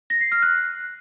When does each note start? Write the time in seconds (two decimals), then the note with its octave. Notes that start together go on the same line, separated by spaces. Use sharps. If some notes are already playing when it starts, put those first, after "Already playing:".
0.10 A#6
0.21 C7
0.32 F6
0.42 F#6